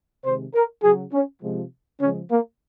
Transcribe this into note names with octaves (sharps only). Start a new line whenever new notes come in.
C3 D#3 G#3 C5
A#4
C#3 F#3 G#4
C#4
C3 F3 G#3
C#3 F3 G#3 C#4
A#3